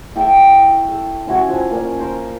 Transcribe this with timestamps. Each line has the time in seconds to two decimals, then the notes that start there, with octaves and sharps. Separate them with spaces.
0.15 E4 A4 G5 C#6
0.89 A4
1.27 C#4 E4 F#4 G#5
1.49 F3 G#5
1.70 A#3 C#4 D5
1.99 A#4 C5